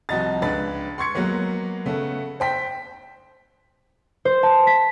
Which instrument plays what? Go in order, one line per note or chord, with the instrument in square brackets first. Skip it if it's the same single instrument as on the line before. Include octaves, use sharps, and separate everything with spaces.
[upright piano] C2 F3 F#4 D#5 A#5 A6
C#2 D4 B4 B5 A6
C6 C#6 G#6 C#7
F#3 G#3 A#3 B3
C#3 A3 B3
C5 G5 B6
[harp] C5
A5
B6